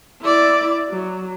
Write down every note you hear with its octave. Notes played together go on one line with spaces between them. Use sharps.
E4 D5
F#3